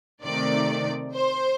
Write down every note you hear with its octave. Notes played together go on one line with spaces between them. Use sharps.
C3 D#3 A3 D5
C5